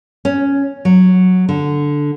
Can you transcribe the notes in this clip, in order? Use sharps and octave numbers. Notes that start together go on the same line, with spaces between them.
C#4
F#3
D3